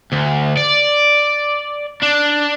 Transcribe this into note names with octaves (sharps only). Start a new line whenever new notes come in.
D2
D5
D4